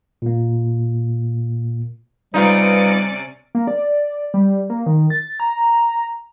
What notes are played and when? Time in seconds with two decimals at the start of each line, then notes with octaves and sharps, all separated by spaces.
0.22 A#2 A#3
2.34 C3 G3 C#4 D#4 F4 B4 D5
3.55 A#3
3.68 D5
4.34 G3
4.70 A#3
4.86 D#3
5.10 A6
5.40 A#5